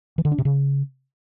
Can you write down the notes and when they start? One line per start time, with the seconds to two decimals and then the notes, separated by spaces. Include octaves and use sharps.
0.18 E3
0.25 D3
0.32 D4
0.38 C3
0.45 C#3